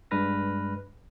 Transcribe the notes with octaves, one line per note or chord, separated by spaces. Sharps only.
G2 G#3 D4 B4 F6 A#6